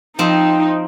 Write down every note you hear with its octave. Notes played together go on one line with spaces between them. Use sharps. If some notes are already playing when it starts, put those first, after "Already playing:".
F3 C4 D#4